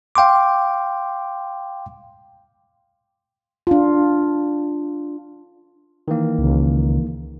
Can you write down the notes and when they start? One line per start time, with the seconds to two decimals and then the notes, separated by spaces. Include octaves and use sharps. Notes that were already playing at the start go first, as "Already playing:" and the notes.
0.15 F5 G5 C6 D6
3.67 D4 F4
6.08 D#3 E3 A#3
6.39 C#2